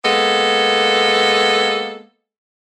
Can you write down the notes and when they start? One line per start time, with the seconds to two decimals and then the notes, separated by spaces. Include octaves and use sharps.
0.04 G#3 A#3 B3 A4